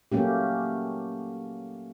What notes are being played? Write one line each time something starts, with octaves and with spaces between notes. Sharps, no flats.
F#3 A3 A#3 C#4 G4